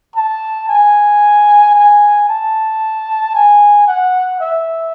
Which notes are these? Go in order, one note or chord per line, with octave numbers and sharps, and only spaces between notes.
A5
G#5
G#5
A5
G#5
F#5
E5